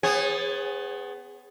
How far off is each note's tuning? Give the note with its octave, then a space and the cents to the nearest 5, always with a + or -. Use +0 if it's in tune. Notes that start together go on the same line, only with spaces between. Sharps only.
B3 +25 G#4 -20 C#5 -35